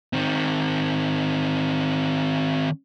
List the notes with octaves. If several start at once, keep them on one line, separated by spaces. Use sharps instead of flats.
D#3 C4